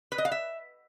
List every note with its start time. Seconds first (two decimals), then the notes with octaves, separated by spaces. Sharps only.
0.12 B4
0.18 D#5
0.25 F5
0.32 E5